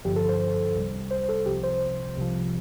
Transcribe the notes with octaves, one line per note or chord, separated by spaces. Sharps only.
G1 G2 D3 F3 G4
A4
C5
C2 C3 G3
C5
A4
C2 C3 F3 G4
C5
C2 C3 F3